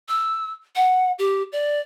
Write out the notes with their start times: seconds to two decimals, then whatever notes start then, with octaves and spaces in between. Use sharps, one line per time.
0.08 E6
0.76 F#5
1.19 G4
1.52 D5